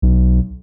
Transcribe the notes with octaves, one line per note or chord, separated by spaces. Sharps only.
B1